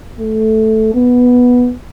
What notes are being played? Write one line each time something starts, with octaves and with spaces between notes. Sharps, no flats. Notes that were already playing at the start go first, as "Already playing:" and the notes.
A3
B3